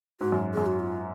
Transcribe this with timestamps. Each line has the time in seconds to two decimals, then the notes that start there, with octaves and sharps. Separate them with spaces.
0.21 G#2 F#4
0.32 F#2
0.54 F#2 G#4
0.66 F#4
0.79 F4